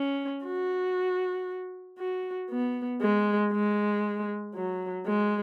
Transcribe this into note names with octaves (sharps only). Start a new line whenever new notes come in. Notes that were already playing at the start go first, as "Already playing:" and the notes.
Already playing: C#4
F#4
F#4
B3
G#3
G#3
F#3
G#3